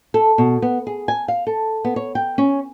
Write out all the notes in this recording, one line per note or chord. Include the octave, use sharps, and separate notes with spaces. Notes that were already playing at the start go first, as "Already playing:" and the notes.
A4
B2
B3
G#4
G#5
F5
A4
B3
C#5
G5
C#4